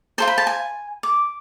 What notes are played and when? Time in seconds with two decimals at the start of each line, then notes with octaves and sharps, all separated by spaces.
0.18 F4 A4 C5 C6
0.28 B5
0.38 A5
0.47 G#5
1.03 D6